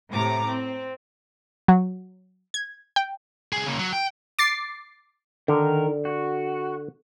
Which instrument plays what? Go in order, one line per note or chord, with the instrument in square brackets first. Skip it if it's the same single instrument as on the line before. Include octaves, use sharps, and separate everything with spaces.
[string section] A2 C3 A#5 D6
C4
[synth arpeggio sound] F#3
G#6
G5
[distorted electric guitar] C2 G#4
C#3 A#3
F#3
G5
[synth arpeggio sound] D6 A6 C7
[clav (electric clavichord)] D3 [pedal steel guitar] D#3 A#4
[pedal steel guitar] F#4